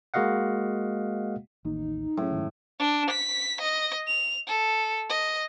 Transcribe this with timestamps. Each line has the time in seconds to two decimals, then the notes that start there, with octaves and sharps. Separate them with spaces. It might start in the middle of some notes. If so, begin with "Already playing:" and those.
0.14 G#3 A#3 F#4 D#5 F5 F#5
1.65 A1 D#2 D#4
2.17 F#2 A2 C#3
2.33 G#2 D#3
2.79 D4
3.10 B6
3.61 D#5
4.07 F7
4.47 A4
5.10 D#5